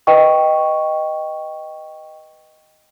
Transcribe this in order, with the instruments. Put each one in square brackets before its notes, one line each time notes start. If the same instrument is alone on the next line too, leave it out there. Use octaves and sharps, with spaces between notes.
[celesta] B4 D#5 G5 C#6